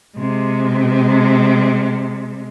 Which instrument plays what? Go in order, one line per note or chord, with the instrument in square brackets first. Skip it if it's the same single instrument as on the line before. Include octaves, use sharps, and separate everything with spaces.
[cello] C3 G#3